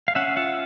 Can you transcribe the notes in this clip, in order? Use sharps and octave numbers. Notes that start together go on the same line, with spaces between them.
F5
C#4 E5 F#5
F4 E5 F#5